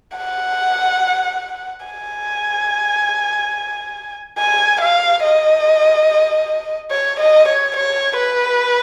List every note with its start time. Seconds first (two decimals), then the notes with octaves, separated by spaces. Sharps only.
0.18 F#5
1.86 G#5
4.38 G#5
4.81 F5
5.23 D#5
6.91 C#5
7.20 D#5
7.48 C#5
7.77 C#5
8.18 B4